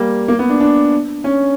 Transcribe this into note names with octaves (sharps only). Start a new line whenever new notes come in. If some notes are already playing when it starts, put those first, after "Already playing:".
Already playing: G3 A#3
A#3
B3
D4
D4
C#4